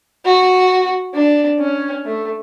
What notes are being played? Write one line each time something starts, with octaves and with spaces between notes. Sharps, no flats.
F#4
D4
C#4
A3